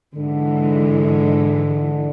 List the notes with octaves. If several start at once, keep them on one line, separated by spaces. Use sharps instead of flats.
G#2 D3 E3 G#3